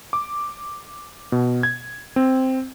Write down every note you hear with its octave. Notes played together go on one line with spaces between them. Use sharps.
D6
B2
G#6
C4